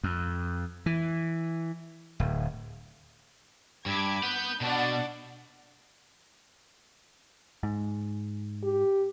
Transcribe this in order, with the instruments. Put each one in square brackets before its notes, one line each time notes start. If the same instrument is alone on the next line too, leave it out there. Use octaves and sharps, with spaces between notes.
[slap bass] F2
E3
D1
[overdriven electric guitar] G2 [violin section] B5 D6 G#6
[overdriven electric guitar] B4 F#5 [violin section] G6
[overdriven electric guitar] B2 [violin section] D4 D5 F#5
[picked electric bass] G#2
[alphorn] G4